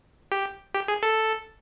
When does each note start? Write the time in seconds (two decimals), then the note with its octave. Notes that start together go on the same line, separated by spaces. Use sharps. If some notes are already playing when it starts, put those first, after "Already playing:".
0.32 G4
0.74 G4
0.88 G#4
1.03 A4